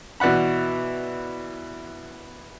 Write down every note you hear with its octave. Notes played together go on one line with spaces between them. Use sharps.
B2 E3 D5 F#5 B5